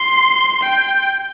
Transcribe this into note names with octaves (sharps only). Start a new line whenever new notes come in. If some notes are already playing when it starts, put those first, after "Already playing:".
Already playing: C6
G5